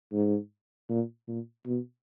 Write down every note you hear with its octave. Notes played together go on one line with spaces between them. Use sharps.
G#2
A#2
A#2
B2